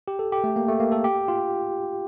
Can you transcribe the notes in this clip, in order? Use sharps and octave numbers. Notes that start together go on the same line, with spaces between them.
G4
A4
G4
A3
A#3
A3
A#3
A4
G4
F4